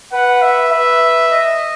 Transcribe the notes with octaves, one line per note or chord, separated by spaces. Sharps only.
B4 F#5
E5
B4 E5
D#5